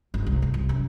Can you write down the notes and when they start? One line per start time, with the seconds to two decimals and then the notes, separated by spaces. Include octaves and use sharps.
0.14 G1
0.26 C2
0.42 G1
0.54 C2
0.69 F#2